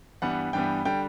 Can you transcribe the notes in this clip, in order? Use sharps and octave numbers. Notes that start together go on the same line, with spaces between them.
G2 E3 G3 B3 F#5
G2 E3 G3 B3 G5
D3 G3 G5